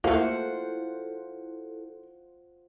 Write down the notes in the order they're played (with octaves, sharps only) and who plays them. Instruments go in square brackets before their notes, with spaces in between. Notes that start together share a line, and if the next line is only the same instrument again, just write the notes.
[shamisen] A3 A#3 [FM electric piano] E4 A4 [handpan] F4 C5 F#5